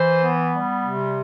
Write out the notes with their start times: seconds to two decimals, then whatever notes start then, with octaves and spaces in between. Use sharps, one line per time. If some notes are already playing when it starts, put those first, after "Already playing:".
Already playing: E3 C5
0.22 B3
0.53 G3
0.85 C3